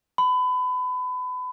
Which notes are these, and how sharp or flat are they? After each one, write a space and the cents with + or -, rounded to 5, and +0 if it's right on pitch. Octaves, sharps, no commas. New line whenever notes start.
B5 +30